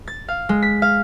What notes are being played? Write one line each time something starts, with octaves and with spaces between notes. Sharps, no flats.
A6
F5
G#3
B6
F5